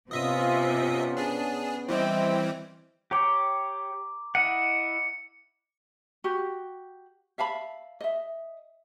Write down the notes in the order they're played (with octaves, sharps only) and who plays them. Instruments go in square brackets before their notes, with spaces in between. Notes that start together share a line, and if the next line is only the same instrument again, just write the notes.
[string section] C3 [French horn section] B3 C#4 [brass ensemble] F4 [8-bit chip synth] D#5 E5 D#6
[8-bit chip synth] D4 G#4
[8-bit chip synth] E3 G3 C4 [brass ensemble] C5 D#5 E5 [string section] G5
[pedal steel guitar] G4 C#5 G5 [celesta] A#5 D6
[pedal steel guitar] E4 D#5 F#5 [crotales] C#7
[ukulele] F#4 G4
E5 F5 A5 B5
D#5 E5